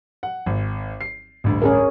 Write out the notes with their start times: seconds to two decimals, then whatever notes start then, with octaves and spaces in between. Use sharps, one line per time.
0.23 F#5
0.46 G#1
1.01 C7
1.44 A1 D2 G2
1.62 C#4 G#4 A#4